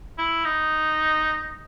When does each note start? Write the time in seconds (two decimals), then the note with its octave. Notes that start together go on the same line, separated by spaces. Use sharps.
0.18 E4
0.45 D#4